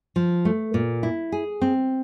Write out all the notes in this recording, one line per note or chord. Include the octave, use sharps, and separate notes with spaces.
F3
A3
A#2
E4
G#4
C4